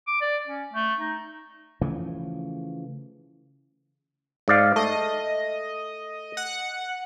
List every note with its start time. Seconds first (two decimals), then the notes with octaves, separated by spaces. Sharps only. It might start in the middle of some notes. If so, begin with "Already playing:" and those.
0.07 D6
0.21 D5
0.47 C#4
0.73 A3
1.00 D#4
1.81 C#3 E3 F3 A3
4.48 G#2 D5 F5
4.76 A3 D#5
6.37 F#5